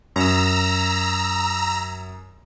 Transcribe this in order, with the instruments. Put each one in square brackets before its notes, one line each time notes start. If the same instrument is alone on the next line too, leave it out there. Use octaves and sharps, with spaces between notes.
[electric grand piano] F#2 [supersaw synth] A#5 E6